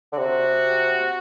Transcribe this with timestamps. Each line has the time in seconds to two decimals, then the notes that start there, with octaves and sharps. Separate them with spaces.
0.12 D3
0.18 C3 F#4